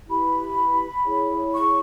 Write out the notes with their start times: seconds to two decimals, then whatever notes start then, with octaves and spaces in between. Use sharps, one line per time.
0.09 E4 G4 B4 B5
1.05 E4 G#4 C#5
1.53 C#6